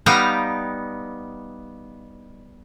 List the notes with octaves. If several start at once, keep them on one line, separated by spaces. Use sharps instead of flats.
G3 B3 D#4 F5 G5 A#5